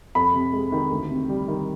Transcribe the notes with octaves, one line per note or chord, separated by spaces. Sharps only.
F2 B5
C3
G#3
D#3
D2
C3
G3
D#3